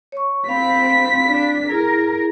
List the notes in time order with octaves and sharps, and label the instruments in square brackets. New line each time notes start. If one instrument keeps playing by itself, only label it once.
[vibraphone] C#5 C#6
[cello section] C4 [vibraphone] F5 B5 [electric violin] B6
[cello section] D4
[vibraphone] E4 G#4 [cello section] A#4